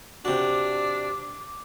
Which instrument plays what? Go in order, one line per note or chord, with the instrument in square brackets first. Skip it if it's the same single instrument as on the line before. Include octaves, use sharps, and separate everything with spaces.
[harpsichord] C3 F#4 [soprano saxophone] D4 [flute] D6